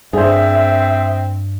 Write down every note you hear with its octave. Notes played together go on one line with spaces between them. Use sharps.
G2 C4 G#4 C5 E5